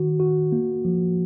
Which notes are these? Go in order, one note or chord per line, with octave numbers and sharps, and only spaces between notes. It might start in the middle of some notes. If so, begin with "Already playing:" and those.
Already playing: D#3 F#4
F#4
A#3
F3